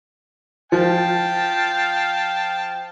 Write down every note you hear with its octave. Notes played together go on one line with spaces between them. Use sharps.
F3 F5 G5 A5